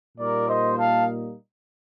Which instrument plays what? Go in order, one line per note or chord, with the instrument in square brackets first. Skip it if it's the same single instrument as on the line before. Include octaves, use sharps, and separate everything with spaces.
[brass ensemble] A#2 G3 A#3 D#4 A#4 D5
C5 D#5
F5 A5